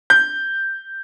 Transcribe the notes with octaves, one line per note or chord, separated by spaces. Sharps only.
G6